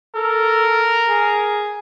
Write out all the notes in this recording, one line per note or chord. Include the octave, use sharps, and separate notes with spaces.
A4 A#4
G#4